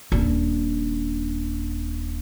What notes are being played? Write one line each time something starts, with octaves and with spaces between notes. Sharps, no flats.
D#1 D4